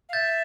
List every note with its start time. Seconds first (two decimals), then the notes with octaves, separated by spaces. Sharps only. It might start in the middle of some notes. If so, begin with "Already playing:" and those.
0.09 F5
0.13 E5 G6 A6